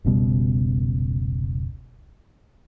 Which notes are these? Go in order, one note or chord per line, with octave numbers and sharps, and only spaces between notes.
F1 C#2 B2 G3